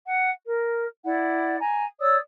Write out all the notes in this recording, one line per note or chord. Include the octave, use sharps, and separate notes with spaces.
F#5
A#4
E4 D5 F#5
G#5 A#5
C#5 D5 D#6 E6